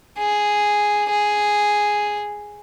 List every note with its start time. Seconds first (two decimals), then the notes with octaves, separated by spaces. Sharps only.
0.18 G#4
1.09 G#4